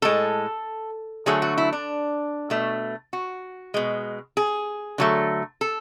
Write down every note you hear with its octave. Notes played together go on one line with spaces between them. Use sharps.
A2 G#3 A4
D3 F#3 A3 G#4
F#4
E4
D4
B2 A3
F#4
B2 G#3
G#4
D3 F#3 A3
A4